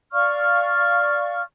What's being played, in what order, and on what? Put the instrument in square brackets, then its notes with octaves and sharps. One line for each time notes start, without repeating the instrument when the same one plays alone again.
[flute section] D5 F5 C#6 F6